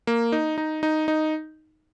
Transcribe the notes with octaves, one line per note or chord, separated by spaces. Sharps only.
A#3
D#4
D#4
D#4
D#4